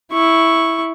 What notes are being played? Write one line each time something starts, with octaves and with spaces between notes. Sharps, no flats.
E4 C#6